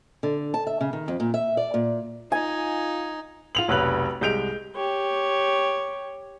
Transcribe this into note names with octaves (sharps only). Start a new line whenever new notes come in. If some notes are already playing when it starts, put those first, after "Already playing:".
D3
A5
E5
C#3
D#3
F2
A#2
E5
D5
A#2
D#4 F4 G#5
F4 F7 F#7
F1 B1 B4 F#6 F#7
C2 G#3 G6 D7 F7
G4 C#5